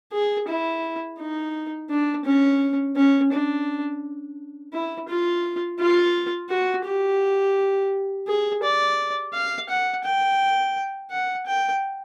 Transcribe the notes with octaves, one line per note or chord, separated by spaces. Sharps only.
G#4
E4
D#4
D4
C#4
C#4
D4
E4
F4
F4
F#4
G4
G#4
D5
F5
F#5
G5
F#5
G5